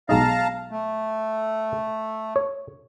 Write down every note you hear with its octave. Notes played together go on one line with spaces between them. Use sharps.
B1 G#3 D#4 F5 A5 A#5
A3
C#5